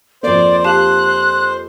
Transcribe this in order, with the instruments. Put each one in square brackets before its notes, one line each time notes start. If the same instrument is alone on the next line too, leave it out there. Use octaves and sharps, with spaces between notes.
[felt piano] F2 A#3 [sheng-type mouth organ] C5 [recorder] D5
[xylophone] G4 F5 A5 [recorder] F#6